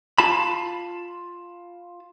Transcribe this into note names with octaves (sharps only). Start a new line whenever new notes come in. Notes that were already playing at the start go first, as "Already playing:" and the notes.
F4 A5 B5